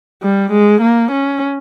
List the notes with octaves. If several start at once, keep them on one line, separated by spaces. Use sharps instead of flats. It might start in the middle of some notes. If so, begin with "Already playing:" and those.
G3
G#3
A#3
C#4